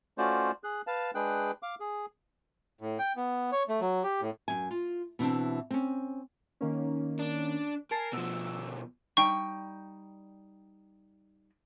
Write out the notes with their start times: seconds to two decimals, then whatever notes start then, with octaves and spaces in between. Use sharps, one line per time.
0.18 A3 C#4 F4 F#4 C5 D5
0.64 G#4 F#6
0.87 B4 F5 A5
1.15 G#3 D4 G#4 B4 G5 F#6
1.63 F5 D6
1.80 G#4
2.81 A2
2.99 G5
3.16 B3
3.52 C#5
3.69 A3
3.81 F#3
4.04 G4
4.21 A2
4.48 F#2 G#5
4.71 F4
5.19 B2 E3 C4 D4
5.71 C4 C#4
6.61 D#3 A#3 C#4
7.19 D4
7.91 A#4 G#5 A5 C7
8.13 B2 F3 E6
9.17 G3 D#4 G5 C#6